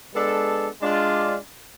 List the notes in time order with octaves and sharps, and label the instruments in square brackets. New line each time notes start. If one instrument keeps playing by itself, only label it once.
[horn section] G#3 B3 D4 A4
G#3 D4 F4